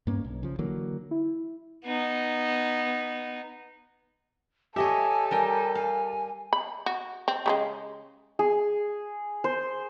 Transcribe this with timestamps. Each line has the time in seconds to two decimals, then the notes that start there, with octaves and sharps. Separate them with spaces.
0.07 G2 A#3 C#4
0.24 B1
0.43 C#3 F3
0.59 D3 E3 F#3 A#3
1.11 E4
1.85 B3 D#4
4.76 G4 A4 C#5 D#5 E5 G#5
5.31 G3 A#4 G5
5.75 F5 G#5
6.53 B5
6.86 F#4
7.28 C4
7.46 C#3 G3 G#3
8.39 G#4
9.44 C5